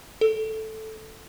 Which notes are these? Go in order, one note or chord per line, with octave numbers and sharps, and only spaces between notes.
A4